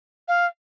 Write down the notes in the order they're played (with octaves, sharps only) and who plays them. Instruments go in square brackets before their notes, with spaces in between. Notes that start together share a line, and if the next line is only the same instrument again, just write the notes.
[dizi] F5